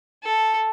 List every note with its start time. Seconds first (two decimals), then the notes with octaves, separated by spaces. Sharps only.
0.23 A4